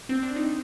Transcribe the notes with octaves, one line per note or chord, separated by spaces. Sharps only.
C4
D4
D#4